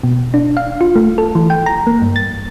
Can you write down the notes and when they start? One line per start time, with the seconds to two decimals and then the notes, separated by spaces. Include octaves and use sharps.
0.03 B2
0.34 D4
0.57 F5
0.81 F4
0.95 A3
1.18 A4
1.35 E3
1.50 G5
1.66 A#5
1.87 A#3
2.02 G2
2.16 A6